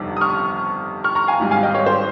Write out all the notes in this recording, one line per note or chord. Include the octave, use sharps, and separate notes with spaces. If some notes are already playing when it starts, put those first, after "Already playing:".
Already playing: G1 F2 C3 D#3 G3
D#6
C#6 F6
C#6 F6
A#5 C#6
F5 G#5
G#1 G#2 G3
F5 G#5
D#5 G5
C#5 F5
C5